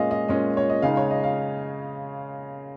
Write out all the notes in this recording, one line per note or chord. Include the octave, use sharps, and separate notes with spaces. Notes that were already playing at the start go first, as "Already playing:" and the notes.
Already playing: A#2 G#3 C#4 D#5 F5
D#5
A#2 G#3 C#4 D#5
C#5
D#5
C#3 G#3 D#4 F5
C#5
D#5
F5